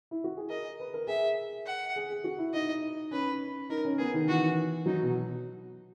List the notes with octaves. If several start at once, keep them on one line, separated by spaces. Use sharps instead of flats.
E4
F#4
G#4
A#4 D#5
B4
A#4
G#4 E5
F#5
G#4
G#4
F#4
E4
D#4 D#5
C#4 B4
D#4 A#4
C#4
B3 G#4
D#3
E3 F#4
F#3 D#4
B2